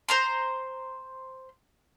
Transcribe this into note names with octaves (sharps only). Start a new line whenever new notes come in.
C5 A#5 C6